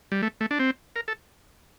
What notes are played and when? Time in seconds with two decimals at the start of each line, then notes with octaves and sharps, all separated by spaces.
0.12 G3
0.22 A3
0.41 A3
0.51 D4
0.60 C4
0.96 A#4
1.08 A4